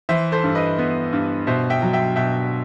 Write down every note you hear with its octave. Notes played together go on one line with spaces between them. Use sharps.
E3 C5 E5
A4 C5
G2
B4 D#5
B3
G2
B2 C5 E5
E5 G5
F#3
E5 G5
B2 E5 G5